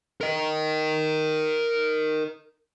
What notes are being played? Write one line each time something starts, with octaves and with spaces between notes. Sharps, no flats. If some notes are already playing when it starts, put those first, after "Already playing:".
A#4 D#5